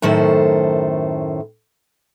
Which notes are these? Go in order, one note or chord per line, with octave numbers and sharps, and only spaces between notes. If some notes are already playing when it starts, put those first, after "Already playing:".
F#2 A2 D#3 A4 C5